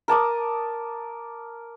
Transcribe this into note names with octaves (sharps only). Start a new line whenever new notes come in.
A#4 A5 D6 D#6